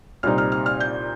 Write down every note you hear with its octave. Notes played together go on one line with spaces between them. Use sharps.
C2 A#2 G3 C4 D#4 F6
F6
F6
F6
G6